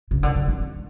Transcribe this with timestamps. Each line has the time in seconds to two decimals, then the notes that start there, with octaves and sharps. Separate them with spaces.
0.11 C#3
0.23 D3
0.36 D3
0.48 D#3